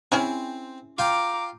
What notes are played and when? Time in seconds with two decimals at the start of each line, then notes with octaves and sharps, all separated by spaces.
0.12 C4 C#4 E4 G#4
0.98 F4 G5 A#5 D6